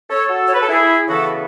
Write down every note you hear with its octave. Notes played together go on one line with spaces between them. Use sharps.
A4 C#5
F#4 A4
C#5
B4
A4
E4 G#4
C#3 E3 B3 E4 F#4 A4